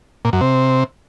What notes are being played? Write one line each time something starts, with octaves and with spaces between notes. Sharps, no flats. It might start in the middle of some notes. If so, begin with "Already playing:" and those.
A#2
F#2
C3